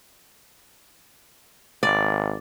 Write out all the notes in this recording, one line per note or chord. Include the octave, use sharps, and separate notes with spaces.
G#1 D5